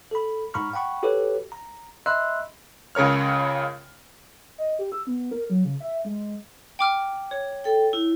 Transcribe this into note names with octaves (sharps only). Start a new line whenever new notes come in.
A4 B5
G#2 A#5 B5 C#6 F6
F#5 G5 B5 C#6
F#4 G4 A4 B4 C#5
A#5
D#5 E5 B5 C6 E6 F#6
C#2 C#3 A#4 C#5 F6
D#5
G4
E6
B3
A#4
F#3
C#3
E5
G#3
G5 D6 F6
C#5
A4 G5
E4